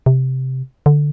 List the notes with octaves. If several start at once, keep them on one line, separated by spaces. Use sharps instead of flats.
C3
D3